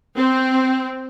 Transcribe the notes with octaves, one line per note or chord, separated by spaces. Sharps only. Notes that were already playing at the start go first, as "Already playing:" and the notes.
C4